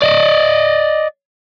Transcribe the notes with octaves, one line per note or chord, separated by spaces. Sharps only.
D5 D#5